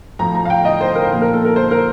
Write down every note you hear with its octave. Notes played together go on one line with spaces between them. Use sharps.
A2 F3 A#5
A#5
F5
G5
D#5
C5
A#4
A#2 F3
A#4
A4
A#4
C5
A#4